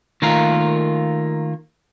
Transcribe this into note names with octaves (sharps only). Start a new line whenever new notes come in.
D#3 A3 A#3 F4 A#4